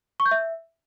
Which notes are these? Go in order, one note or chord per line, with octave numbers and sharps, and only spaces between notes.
C#6
G6
E5